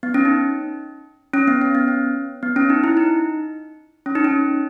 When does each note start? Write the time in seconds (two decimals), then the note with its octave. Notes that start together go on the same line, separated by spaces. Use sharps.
0.03 B3
0.14 C#4
0.25 D#4
1.34 C#4
1.48 B3
1.62 C#4
1.75 B3
1.88 C#4
2.43 B3
2.56 C#4
2.70 D#4
2.84 E4
2.97 D#4
4.06 C#4
4.15 D#4
4.24 C#4